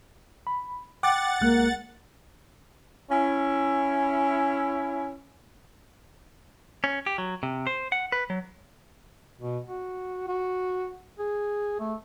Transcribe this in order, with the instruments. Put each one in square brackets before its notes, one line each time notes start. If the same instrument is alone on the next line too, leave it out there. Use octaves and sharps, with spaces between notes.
[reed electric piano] B5
[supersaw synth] F#5 A6 [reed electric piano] G5 D6
[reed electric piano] C2 G#3 F#6 [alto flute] A#3
[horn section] C#4 E4
[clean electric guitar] C#4
G4
F#3
C3
C5
F#5
B4
F#3
[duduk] B2
F#4
F#4
G#4
A3